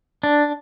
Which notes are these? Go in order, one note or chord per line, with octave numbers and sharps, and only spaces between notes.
D4